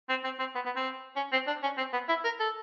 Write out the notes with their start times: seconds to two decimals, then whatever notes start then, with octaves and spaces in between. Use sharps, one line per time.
0.09 C4
0.24 C4
0.39 C4
0.55 B3
0.65 B3
0.76 C4
1.16 C#4
1.32 C4
1.47 D4
1.63 C#4
1.78 C4
1.93 B3
2.09 E4
2.24 A#4
2.40 A4